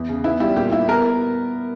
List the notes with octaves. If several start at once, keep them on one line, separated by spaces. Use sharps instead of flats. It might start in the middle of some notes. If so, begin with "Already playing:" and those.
Already playing: E2
C#3
B3 E4
G3 E4
A#2 G4
A#2 E4
B3 A#4